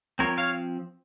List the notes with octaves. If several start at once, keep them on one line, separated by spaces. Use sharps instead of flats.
F3 C4 A#4 C#5
C#5 F5